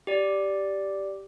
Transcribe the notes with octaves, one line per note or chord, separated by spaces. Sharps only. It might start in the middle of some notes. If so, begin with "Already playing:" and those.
G4 D5